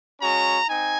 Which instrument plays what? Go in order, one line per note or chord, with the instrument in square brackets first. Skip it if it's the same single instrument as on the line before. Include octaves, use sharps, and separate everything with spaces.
[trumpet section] G#3 C#4 F#4 A#5
C4 D#4 G#5